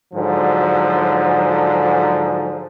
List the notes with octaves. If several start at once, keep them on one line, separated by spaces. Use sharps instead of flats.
G#2 D3 F3 F#3